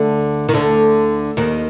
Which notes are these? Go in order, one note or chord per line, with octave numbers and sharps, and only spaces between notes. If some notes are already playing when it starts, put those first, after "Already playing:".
Already playing: D2 D3
D#3
D2 D3
D#2 D#3